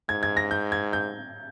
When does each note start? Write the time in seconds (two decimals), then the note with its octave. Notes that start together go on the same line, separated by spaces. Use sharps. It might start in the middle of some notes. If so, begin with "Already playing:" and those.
0.09 G#2 G#6
0.23 G#6
0.37 A#6
0.51 G6
0.72 G#6
0.93 G6